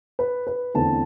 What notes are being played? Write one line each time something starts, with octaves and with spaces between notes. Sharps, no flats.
B4
B4
E2 D3 A3 C4 A5